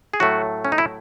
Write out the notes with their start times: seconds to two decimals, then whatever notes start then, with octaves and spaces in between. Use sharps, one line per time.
0.14 G#4
0.20 A2 F#3 A3 F#4
0.65 C#4
0.72 D#4
0.78 E4